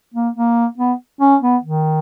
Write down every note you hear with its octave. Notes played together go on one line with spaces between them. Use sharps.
A#3
A#3
B3
C#4
B3
D#3